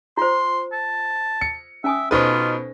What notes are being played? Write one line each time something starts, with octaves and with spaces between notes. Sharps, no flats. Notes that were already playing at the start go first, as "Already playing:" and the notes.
F4 C5 C6
A5
C#7
C#4 E5 G#5 D#6
B2 D#4 F4 A4 B4 C5 C#6